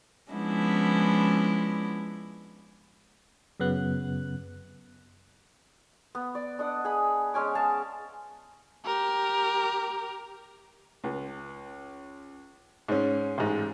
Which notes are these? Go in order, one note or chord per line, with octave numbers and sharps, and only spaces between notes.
F3 G#3 B3 C#4 D4 E4
F#2 C#3 B3 F#6
B3
D5
D4 D#5 F#5
G#4 B5
G#3 C#4 G#5 D6
G#4 F5 A5
G4 A#4
C#2
G#2 C#4
A1 G#2